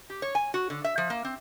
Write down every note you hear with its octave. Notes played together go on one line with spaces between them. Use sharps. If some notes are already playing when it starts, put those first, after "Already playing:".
G4
C#5
G#5
F#4
D3
E5
F3
A#3
C4